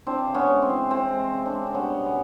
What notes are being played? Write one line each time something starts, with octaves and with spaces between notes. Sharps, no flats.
E3 C4 D4
C#3
B3 C#4
G#3
C4
E3
E3 C4
G#3
C#3
C4 D4
G#3
C4
G3 B3 C#4
B2
B3